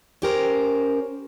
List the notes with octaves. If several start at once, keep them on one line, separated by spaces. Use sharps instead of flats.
C#4 G4 A#4 C5